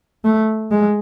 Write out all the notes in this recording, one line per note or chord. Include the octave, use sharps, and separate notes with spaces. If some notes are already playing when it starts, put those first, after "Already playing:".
A3
G#3